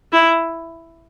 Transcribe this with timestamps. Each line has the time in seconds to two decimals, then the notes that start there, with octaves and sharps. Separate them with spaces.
0.12 E4